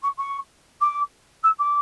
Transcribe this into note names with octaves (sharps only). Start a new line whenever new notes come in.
C#6
C#6
D6
E6
D6